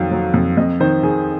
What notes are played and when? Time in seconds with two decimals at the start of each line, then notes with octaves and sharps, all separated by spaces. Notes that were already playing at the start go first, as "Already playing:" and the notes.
Already playing: F2 D#3 F#3 F5
0.11 F#3
0.34 F2
0.57 F2 D#5
0.80 D#3 C5
1.03 D#3 G#4